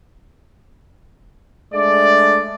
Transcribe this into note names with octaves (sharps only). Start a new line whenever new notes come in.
G#3 A3 D4 D5